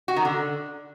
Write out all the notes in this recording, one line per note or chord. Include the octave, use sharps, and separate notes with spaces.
F#4
D#3
D3